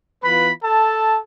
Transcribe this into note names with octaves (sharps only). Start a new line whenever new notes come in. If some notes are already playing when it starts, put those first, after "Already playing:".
E3 B3 F4 B4 B5
A4 A5